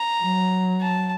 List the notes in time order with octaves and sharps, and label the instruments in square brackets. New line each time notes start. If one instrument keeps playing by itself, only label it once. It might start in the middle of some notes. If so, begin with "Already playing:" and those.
Already playing: [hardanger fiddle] A#5
[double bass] F#3
[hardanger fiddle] A5